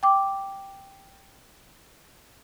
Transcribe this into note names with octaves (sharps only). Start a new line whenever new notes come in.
G5 D6